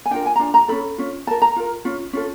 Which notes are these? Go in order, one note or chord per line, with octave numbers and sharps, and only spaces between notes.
G#5
D4 F4 A#4 G5
G#5
A#5
D4 F4
A#5
C#4 F4 A4 B5
C#4 F4
F4 A#4 A5
A#5
F4 A#4
C#4 F4
C#4 F4 A4